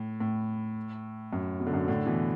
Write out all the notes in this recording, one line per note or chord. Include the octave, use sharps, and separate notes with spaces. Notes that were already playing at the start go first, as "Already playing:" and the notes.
Already playing: A2
A2
F#2
B2
D3
F#2 B2
A2 D3
B2 E3